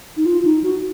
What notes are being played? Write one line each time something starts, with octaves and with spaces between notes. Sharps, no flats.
D#4
F4
D#4
F#4